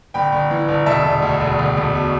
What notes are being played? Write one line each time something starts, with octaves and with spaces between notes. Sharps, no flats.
G1 G5 B5
G1
E3
G1
E1 E5 A5
E1
D2
E1
E1
E1
B2